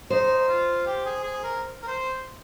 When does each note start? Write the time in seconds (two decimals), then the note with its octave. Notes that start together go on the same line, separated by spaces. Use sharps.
0.10 D#4 C5
0.48 F4
0.86 G4
1.05 G#4
1.24 G#4
1.43 A#4
1.82 A#4
1.87 C5